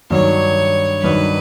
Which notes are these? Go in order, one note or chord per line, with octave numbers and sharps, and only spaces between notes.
G2 D#3 F#3 C#5
G2 D#3 F#3 B4